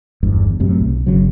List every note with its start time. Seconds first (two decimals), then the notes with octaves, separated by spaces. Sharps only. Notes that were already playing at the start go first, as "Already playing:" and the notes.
0.23 G1 E2 G2
0.60 F#2 A2 C3
0.80 B1
1.06 G1 C#3 F#3